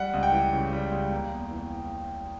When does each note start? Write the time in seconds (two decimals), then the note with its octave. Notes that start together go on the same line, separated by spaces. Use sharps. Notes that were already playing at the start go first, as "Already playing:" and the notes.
Already playing: G3 F#5
0.14 C#2
0.23 G5
0.32 E3
0.53 C#3
0.73 G3
0.92 C#2
1.12 A#3
1.32 E2
1.51 E3